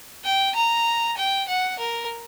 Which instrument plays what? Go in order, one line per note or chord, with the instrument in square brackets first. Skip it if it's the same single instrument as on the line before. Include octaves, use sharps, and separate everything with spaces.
[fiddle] G5
A#5
G5
F#5
A#4